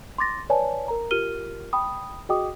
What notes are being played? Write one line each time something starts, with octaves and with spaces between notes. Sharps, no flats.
C6 D6 A6 A#6
B4 C#5 D5 G#5 A5
A#4 A#5
F4 G4 A#4 F6 D#7 G7
G5 B5 D#6
F#4 G#4 D#5 G5 D6 D#6